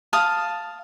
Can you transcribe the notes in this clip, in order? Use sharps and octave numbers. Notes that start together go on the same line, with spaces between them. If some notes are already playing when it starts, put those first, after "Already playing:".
F5 A5 D#6